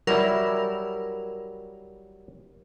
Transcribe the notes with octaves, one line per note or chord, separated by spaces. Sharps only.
F#3 G3 E4 A#4